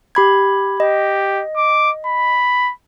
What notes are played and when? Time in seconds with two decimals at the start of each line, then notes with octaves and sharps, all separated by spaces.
0.15 G4 B5 G#6
0.80 G4 D#5
1.57 D6
2.06 B5